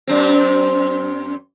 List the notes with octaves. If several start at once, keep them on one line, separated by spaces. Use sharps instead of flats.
F#2 C4